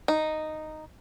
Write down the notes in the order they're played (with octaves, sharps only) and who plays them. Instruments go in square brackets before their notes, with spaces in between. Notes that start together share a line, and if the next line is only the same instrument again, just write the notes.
[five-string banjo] D#4